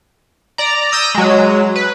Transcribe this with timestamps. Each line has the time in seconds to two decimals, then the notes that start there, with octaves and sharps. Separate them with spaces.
0.58 D5 A#5
0.92 D#6 E6 G6 A#6 D#7
1.15 F#3 G#3
1.76 B4